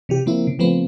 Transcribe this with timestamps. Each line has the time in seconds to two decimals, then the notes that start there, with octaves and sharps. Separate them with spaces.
0.09 C3 E3 G4
0.26 C#3 F3 A#3 C4 E4
0.47 C#3
0.59 C#3 F3 A3 B3 C4